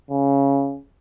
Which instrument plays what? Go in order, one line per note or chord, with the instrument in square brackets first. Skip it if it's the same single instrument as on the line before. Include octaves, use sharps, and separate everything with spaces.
[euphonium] C#3